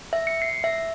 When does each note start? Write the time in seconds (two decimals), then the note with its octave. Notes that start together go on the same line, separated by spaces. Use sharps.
0.13 E5
0.27 C#7
0.42 C7
0.64 E5